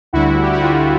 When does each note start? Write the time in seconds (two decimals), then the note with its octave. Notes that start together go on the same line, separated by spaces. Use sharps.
0.13 D2 D3 G3 E4 F#4
0.42 G4
0.53 F#4
0.62 F4